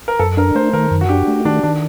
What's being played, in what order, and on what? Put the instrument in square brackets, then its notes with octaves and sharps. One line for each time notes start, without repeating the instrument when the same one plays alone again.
[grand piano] A#4
[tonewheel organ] F#2 [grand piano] A4
[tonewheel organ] D4 [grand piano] A#4
[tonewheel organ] A3 [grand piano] C5
[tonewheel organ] D#3 [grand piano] A#4
[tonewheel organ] F#2
[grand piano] F#4
[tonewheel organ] D4 [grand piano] G4
[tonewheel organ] A3
[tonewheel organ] D#3 [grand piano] D4
[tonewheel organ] D#3 [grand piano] D4